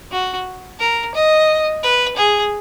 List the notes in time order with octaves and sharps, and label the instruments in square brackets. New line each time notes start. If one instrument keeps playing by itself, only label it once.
[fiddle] F#4
A#4
D#5
B4
G#4